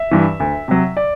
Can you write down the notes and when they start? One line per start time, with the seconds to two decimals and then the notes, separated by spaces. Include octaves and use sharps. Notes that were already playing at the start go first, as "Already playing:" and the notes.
Already playing: E5
0.11 G2 E3
0.40 D2
0.68 C3 F#3
0.97 D5